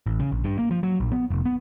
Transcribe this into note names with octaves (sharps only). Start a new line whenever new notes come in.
A1
C#3
A#1
G2
A#3
F3
F#3
A#1
B3
F1
B3